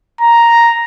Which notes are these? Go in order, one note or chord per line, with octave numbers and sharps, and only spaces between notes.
A#5